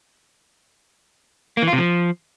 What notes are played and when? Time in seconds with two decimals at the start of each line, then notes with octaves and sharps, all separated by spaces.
1.57 A#3
1.62 E3
1.68 F4
1.73 C3
1.78 F3